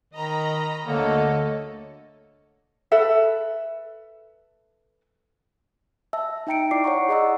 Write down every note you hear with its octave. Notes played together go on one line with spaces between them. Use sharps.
D#3 D#5 A#5 B5
D2 D3 A3 A#3 A4 C#5 D#5
A4 B4 E5
E5 A5 E6
D#4 E5 G5 A#5 C#7 D7
E4 D5 D6 C7
C#5 F#5 A#5 C#6
G#4 D5 D#5 F#5 A#5 E6